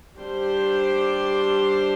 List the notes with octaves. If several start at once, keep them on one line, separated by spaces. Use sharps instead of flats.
G3 D4 G4 C5